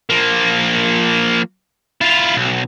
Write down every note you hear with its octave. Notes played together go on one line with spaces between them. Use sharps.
F3 A#3
E4 F4
B1